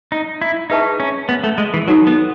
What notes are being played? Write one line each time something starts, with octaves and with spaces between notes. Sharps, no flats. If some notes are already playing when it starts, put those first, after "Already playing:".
D#4
E4
D#4 G#4 B4 E5 A5 C#6
C#4
B3
A3
G#3
E3
F#3 D#4 F#4 A4
B3